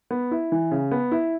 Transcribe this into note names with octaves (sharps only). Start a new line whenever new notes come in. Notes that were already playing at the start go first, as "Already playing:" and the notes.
B3
E4
E3
C#3
B3
E4